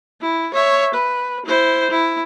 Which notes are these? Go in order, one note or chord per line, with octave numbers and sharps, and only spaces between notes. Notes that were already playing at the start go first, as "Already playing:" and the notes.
E4
C#5 E5
B4
E4 C5
E4